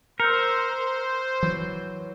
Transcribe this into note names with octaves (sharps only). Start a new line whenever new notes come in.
A#4 C5 E6 G6 C#7
E3 F#3